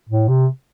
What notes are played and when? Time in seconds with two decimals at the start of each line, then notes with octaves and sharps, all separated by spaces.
0.09 A2
0.29 C3